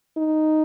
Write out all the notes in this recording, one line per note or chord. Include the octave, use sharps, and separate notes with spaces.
D#4